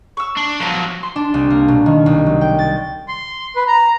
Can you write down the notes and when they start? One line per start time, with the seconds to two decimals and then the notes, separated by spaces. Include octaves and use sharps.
0.17 C#6 E6
0.37 D4
0.60 F3 F#3 B3 A#5
1.03 C6
1.16 D4
1.34 C2
1.50 A#3
1.68 B2
1.86 D#3
2.06 C2
2.26 F#3
2.41 G5
2.59 A6
3.08 C6
3.56 B4
3.67 A#5